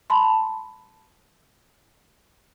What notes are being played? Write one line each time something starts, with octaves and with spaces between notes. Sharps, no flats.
A5 B5 C6